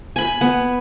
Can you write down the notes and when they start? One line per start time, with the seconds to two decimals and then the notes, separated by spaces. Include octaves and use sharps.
0.16 G#5 B5
0.41 B3